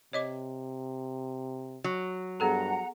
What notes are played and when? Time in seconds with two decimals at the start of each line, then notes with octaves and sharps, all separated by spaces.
0.13 C3 C#5 D#5 D6
1.84 F#3
2.40 G2 B3 G#4 A4 F#5 A#5